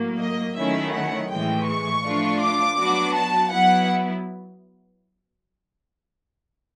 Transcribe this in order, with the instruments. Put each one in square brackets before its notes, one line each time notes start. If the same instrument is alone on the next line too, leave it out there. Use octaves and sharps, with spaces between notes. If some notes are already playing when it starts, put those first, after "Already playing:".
Already playing: [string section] A2 F#3 A#3
[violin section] D#5
[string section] D#3 F#3 A3 C#4 E4 [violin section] E5
[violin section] F#5
[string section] A2 E3 G#3 [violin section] G5
[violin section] C#6
[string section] F3 A3 D4 F4
[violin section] D6
[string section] F#3 B3 D4 F#4
[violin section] A5
[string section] F#3 B3 E4 [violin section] F#5